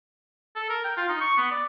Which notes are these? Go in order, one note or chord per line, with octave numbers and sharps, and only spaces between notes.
A4
A#4
G5
F4
D#4
C#6
B3
D5